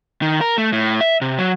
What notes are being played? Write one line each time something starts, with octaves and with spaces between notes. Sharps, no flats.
D#3
A#4
A3
A2
E5
C3
F#3